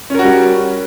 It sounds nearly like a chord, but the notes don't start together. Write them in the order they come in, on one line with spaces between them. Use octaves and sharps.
C#4 A#4 F#4 G3